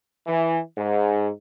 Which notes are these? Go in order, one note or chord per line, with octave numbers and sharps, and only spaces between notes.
E3
G#2